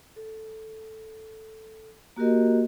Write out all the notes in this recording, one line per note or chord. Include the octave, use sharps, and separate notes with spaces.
A4
A#3 F#4 G4 A#4 D#5